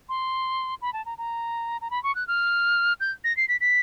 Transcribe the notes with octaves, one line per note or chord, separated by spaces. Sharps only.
C6
B5
A5
A#5
A#5
A#5
B5
C#6
F#6
F6
G6
A#6
C7
B6
B6